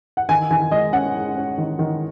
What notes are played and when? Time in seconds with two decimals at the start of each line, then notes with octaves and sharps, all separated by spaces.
0.17 F#5
0.29 D#3 G#5
0.51 D#3 G#5
0.71 G#3 D#5
0.93 C#4 F#5
1.15 G#3
1.36 C#4
1.58 D#3
1.79 D#3